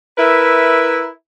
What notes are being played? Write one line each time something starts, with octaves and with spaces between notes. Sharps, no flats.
E4 A#4 B4 E5